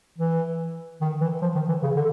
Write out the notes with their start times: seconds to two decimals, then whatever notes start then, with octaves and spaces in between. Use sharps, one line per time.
0.18 E3
1.01 D#3
1.21 E3
1.42 F3
1.55 D#3
1.69 E3
1.83 C#3
1.96 D3